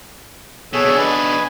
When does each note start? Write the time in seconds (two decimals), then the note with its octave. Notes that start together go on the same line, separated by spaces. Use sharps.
0.73 B2 G#4 A4 C#5
0.85 B2 D4
0.98 B4 D#5 G#5